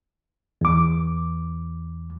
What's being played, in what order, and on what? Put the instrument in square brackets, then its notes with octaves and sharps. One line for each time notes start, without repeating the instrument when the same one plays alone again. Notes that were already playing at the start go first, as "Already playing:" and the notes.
[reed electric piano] E2 D6